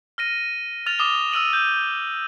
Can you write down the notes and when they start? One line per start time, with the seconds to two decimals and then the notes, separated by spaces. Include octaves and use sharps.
0.18 F6 A#6 D#7
0.86 F6 A6 F7
0.99 D6 D#6 G7
1.32 E6 F6 D#7 F#7
1.53 G6